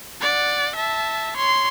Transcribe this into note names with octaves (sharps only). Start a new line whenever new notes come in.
D5 F#5
E5 A5
C#5 C6